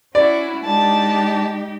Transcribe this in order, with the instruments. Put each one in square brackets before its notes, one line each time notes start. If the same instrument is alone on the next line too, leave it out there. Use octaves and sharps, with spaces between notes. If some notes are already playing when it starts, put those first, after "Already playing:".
[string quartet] C#4 E4 F#4 [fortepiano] D5
[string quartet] G#3 D#4 G4 [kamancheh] D4 A5